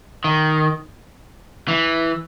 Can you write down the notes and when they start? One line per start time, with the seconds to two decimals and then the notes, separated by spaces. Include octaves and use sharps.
0.24 D#3
1.68 E3